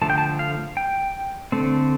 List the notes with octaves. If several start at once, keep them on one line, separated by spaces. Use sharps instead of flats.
D3 F3 A3 A5
G5
A5
F5
G5
D3 A3 C4